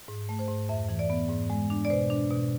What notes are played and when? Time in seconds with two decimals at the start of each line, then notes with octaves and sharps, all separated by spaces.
0.08 G#2
0.29 A3
0.39 C5
0.48 G#2
0.69 F2 E5
0.89 E3
0.99 D5
1.10 B3
1.29 G#2
1.50 G#3
1.70 D4
1.85 D5
1.90 B2 C5
2.10 D4
2.31 B2